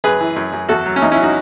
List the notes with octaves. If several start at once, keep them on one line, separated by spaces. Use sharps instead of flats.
F#2 G#4 B4
E3
F#2
F#2
E2 F#4 A4
F#3
C#4
E2 D#4
C#4 E4
F#3
D#4 F#4